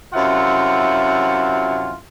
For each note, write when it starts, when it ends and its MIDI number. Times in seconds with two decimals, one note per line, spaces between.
0.13 1.95 42
0.13 1.95 48
0.13 1.95 64
0.13 1.95 65
0.13 1.95 78